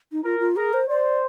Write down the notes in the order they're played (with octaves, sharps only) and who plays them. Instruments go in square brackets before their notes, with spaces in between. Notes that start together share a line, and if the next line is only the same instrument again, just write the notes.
[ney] D#4
[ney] F4 [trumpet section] A#4
[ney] F4
[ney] G#4 [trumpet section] A#4
[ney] C5
[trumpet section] C5 [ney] D5